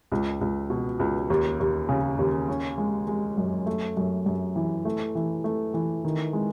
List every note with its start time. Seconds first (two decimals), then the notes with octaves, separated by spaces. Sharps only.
0.12 C#2
0.41 C#2
0.70 B2
0.99 C#2
1.30 D#2
1.60 D#2
1.89 C#3
2.19 D#2
2.49 C#4
2.78 G#3
3.08 G#3
3.38 F#2
3.66 A3
3.97 F#2
4.26 F#2
4.56 E3
4.85 A3
5.15 E3
5.44 A3
5.74 E3
6.05 D#3
6.33 G#3